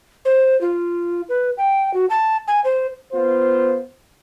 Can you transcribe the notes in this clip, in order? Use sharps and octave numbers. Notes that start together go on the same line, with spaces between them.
C5
F4
B4
G5
F#4
A5
G#5
C5
B3 F4 C5